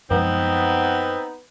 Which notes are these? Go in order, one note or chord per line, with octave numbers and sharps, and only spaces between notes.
F#2 F3 G#3 B3 C4 D#4